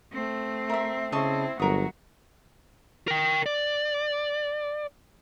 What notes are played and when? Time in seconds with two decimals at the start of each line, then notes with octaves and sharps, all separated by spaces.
0.12 A3 C4
0.70 A#4 E5 C6
1.12 C#3 C4 E4 D#5 A5 C#6
1.60 G1 F#3 F#4 A#4 D#6
3.08 A#4 G5
3.46 D5